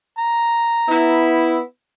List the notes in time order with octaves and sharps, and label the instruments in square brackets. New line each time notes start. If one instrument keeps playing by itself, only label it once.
[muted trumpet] A#5
[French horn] B3 [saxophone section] E4